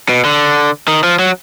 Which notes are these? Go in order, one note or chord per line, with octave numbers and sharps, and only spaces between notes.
B2
D3
D#3
F3
F#3